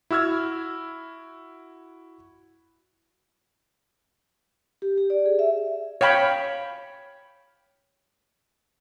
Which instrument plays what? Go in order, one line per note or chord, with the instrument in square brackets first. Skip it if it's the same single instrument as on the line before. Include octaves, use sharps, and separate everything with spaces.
[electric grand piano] E4 F#4 E6 F6 G#6
[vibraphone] G4
G4
D5
G#4
E5
[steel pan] C#5 F5 G5 B5 C#6